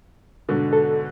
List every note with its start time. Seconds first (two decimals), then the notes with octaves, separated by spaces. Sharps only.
0.49 G#2 B2 D3
0.73 A4